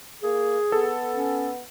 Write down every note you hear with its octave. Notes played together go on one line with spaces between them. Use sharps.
A#3 G#4
B3 A4
C#4